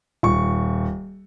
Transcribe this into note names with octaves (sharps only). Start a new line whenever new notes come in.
D#1 C#6